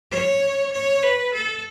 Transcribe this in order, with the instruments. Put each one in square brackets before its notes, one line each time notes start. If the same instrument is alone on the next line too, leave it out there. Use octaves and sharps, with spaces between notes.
[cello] C#5
C#5
B4
A4